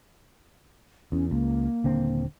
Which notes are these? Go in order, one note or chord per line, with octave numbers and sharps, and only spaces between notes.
E2 C#4
C#2 A#3
D#1 D3 C4